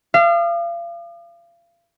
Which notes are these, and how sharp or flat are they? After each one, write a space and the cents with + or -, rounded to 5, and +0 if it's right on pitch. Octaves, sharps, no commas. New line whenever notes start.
F5 -35 D#6 -45